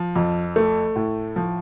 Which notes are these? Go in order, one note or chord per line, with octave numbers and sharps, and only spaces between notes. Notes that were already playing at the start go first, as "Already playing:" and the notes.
Already playing: F3
F2
A3
A2
F3